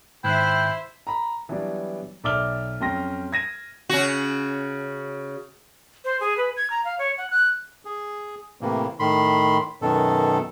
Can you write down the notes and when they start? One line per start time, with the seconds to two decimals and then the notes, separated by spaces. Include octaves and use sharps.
0.24 G#2 D#3 E4 C5 E5 G5 F#6
1.07 A#5 B5
1.49 E3 F#3 G3 B3 D4
2.24 B1 D5 E5 D6 F6 G7
2.80 F2 F#3 C#4 G5 C6 A#6
3.33 G#6 A#6 D#7
3.89 C#3 F#4
6.05 C5
6.20 G#4
6.37 B4
6.57 G#6
6.70 A#5
6.84 F5
6.99 C#5
7.18 F#5
7.30 F#6
7.85 G#4
8.61 A2 C3 E3 A#3
8.99 A2 D#3 B5 C6
9.82 F#2 B2 D#3 A4